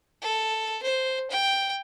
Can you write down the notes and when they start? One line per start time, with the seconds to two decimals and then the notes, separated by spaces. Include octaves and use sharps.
0.22 A4
0.83 C5
1.31 G5